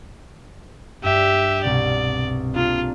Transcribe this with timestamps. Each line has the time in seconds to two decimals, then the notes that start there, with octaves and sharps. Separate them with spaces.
1.04 G2 G4 E5
1.64 C2 B2 D5
2.55 A#3 D4 F4 G#4